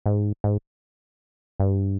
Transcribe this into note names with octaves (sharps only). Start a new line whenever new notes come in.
G#2
G#2
G2